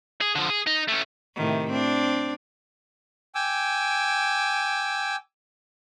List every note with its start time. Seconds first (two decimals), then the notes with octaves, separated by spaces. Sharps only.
0.21 G#4
0.35 D3 F3
0.50 G#4
0.67 D#4
0.89 A3 C#4
1.35 A2 C3 D#3
1.70 C4 D4
3.35 G5 G#5 D6 E6